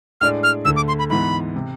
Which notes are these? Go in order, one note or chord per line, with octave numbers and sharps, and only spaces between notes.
A2 G#3 D4 G#4 D5 F6
F6
D2 D3 A3 E6
D6
C6
B5
G#2 E3 B3 B5
C3